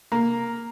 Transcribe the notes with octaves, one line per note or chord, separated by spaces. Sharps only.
A#3